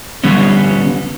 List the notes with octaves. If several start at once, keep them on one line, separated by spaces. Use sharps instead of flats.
D3 G3 B3 C#4